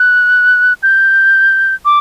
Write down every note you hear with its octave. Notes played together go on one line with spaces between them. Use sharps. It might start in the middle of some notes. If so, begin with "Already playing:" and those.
Already playing: F#6
G6
D6